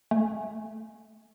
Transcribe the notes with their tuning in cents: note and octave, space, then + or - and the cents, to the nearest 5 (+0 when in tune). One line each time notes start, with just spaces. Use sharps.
A3 +0 G#5 +0